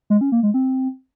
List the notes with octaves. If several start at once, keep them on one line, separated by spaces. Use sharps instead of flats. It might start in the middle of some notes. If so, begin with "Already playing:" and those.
G#3
C#4
A#3
G#3
C4